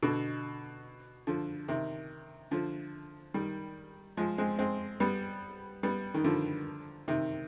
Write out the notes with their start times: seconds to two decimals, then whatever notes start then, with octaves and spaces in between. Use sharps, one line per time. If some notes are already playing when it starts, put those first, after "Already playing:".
0.03 B2 D3
1.27 D3 F3
1.68 C3 D#3
2.51 D3 F3
3.34 D#3 G3
4.17 F3 G#3
4.38 G#3 C4
4.59 G#3 C4
5.00 G3 B3
5.83 G3 B3
6.14 D#3
6.24 D3 F3
7.08 C3 D#3